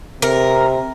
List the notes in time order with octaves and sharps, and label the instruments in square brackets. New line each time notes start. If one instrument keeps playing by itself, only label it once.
[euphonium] C3 [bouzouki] A#4